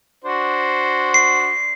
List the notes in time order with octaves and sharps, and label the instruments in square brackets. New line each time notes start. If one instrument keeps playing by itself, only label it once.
[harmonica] D4 F#4 C5
[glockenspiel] C7